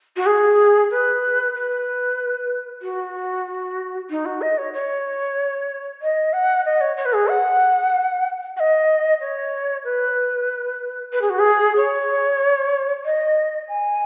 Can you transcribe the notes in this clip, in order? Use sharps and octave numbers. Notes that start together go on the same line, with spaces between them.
F#4
G#4
B4
B4
F#4
D#4
F#4
D#5
C#5
C#5
D#5
F#5
D#5
C#5
C#5
B4
G#4
F#5
F#5
D#5
C#5
B4
B4
G#4
F#4
G#4
C#5
D#5
G#5